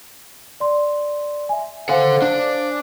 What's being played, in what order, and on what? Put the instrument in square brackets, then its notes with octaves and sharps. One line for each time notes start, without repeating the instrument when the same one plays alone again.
[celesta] D5 C6
E5 G#5
[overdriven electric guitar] A4 F#5 [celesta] C5 F5 G#5
[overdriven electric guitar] D4